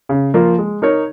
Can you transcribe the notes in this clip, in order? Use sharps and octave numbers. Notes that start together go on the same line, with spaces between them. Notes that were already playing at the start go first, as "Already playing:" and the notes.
C#3
F3 A#3 F4
G#3
D#4 A#4 C#5